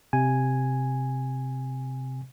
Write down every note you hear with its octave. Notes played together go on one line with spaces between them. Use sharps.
C3 G#5